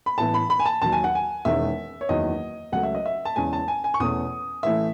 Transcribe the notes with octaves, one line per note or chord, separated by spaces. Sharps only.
B5
A1 A2 E3 B3 A5
B5
B5
G#5
A5
D#2 D#3 F#3 A5
G#5
F#5
G#5
E1 E2 D#3 G#3 C#4 E5
C#5
F#1 E2 D#3 F#3 D#5
C#2 C#3 F#3 A3 C#4 F#5
E5
D#5
E5
A5
E2 C#3 E3 G#3 C#4 G#5
A5
G#5
G#5
C#6
E2 B2 A3 C#4 D#6
A1 A2 E3 A3 E5